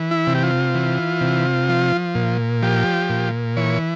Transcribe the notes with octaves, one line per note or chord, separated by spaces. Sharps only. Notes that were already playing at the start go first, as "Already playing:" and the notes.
Already playing: E3
E4
C3
G4
F4
E3
C3
F3
A#2
F3 G4
A#2
E3 C#5